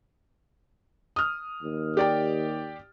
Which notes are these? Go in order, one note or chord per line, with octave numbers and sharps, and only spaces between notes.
D#6 F6
D#2
G4 D5 G5